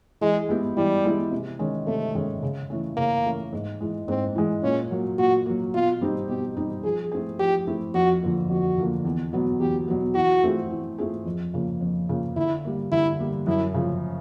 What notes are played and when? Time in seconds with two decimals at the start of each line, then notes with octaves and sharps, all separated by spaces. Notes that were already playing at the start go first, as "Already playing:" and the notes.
0.21 E3 G#3
0.49 G#3 B3 E4 G4
0.77 E3 G3
1.04 G#3 B3 E4 G4
1.32 C3
1.59 D#3 G#3 C#4
1.87 C3 A3
2.15 D#3 G#3 C#4
2.42 C#3
2.70 E3 A3 C#4
2.97 C#3 A#3
3.25 E3 A3 C#4
3.53 G#2
3.81 E3 G#3
4.08 G#2 C4
4.36 E3 G#3
4.63 A#2 C#4
4.91 F#3 A#3
5.18 A#2 F#4
5.46 F#3 A#3
5.74 B2 F4
6.01 G3 C4 D#4 G4
6.28 B2 G4
6.57 G3 C4 D#4 G4
6.84 F3 G#4
7.12 A3 C4 E4 G#4
7.39 F3 G4
7.67 A3 C4 E4 G#4
7.94 F2 F#4
8.23 D3 F3 A#3
8.50 F2 F#4
8.78 D3 F3 A#3
9.05 E2
9.33 B2 F#3 B3
9.60 E2 G4
9.88 B2 F#3 B3
10.15 E3 F#4
10.43 A3 C4 F4 G#4
10.70 E3
10.98 A3 C4 F4 G#4
11.26 F2
11.54 C#3 F3 A#3
11.81 F2
12.09 C#3 F3 A#3
12.36 D3 E4
12.64 G3 A#3
12.92 D3 E4
13.19 G3 A#3
13.47 F#2 E4
13.74 C#3 F3